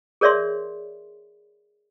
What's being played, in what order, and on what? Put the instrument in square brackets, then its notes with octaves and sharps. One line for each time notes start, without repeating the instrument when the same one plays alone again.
[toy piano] G#4 A#4 C#5 D5 E5 C6